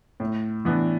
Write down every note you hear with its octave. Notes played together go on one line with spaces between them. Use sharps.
A2
E3 B3 D4